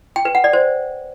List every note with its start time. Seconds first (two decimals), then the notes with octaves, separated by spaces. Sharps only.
0.16 G5
0.25 B4
0.35 F#5
0.44 D5
0.53 C5